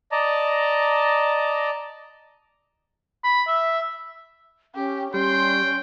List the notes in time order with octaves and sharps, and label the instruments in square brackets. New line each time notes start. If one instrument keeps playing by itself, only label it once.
[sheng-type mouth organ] D5 D#5 A5 A#5
[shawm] B5
E5
[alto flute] C#4 [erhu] G4
[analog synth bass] G3 [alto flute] C#4 [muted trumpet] G5 [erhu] C6